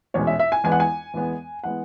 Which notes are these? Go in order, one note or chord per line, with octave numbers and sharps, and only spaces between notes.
E1 E2 B2 G#3 C#4 C#5
E5
E5
G#5
E2 E3 G#3 B3 G#5
F#5
G#5
E2 E3 G#3 B3
E3 G#3 B3 F#5